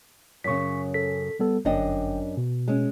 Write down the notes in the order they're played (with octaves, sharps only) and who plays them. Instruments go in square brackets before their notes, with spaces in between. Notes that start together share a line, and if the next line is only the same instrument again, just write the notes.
[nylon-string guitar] F#2 C#3 [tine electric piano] C#6 B6
[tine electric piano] A4 B6
G3 B3 A4
[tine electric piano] G1 G5 [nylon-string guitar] F#2 D4 D#5
[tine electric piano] B2
[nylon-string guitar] G#3 C#4